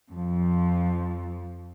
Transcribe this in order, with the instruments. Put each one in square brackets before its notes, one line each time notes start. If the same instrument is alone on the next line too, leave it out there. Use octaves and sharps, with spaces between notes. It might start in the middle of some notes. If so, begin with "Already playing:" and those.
[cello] F2 F3